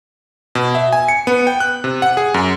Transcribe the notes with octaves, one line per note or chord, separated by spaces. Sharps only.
B2
E5
G#5
C#7
B3
G5
F#6
C3
F#5
G#4
F#2